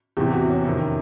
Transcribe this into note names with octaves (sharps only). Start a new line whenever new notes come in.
E2 C3 E3 G4
F#4
C#4
F2 C3 D#3